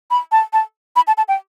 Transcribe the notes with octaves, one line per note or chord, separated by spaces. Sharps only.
B5
A5
A5
B5
A5
A5
G5